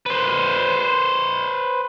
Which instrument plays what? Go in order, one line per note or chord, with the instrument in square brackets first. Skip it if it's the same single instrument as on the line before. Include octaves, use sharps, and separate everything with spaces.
[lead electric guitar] B4 C5